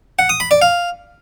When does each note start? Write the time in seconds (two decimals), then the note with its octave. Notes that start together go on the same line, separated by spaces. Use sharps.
0.19 F#5
0.29 D#6
0.40 B5
0.51 D5
0.62 F5